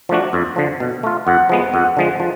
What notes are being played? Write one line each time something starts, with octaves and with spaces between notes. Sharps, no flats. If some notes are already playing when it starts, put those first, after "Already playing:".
F3 A3 D4 F#4
F2
D3 F3
B2
A3 F4
F2 F#5
F3 G#3 B3
F2 F#5
D3 F3 G#3
F3